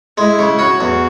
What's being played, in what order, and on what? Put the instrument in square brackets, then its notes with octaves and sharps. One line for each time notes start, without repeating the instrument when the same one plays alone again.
[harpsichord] G#3 [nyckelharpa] E4
[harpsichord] C#3
[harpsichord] C#4 [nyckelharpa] F#4
[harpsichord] E2